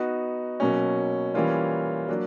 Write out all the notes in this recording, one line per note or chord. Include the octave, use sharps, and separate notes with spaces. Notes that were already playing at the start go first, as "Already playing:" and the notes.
Already playing: B3 D#4 F#4
B2 F#3 A#3 C#4
E3 G3 A#3 C#4 F4
F#3 A#3 D4